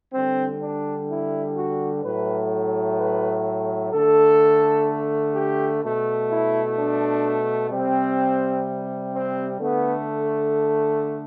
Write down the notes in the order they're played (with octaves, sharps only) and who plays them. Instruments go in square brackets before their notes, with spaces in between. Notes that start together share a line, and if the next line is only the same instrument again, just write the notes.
[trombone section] D3 G3 C4
D4
E4
F#4
A2 F#3 A3 B4
B4
D3 A3 A4
G4
B2 A3
E4
D4
C3 G3 C4
C4
D3 A3 B3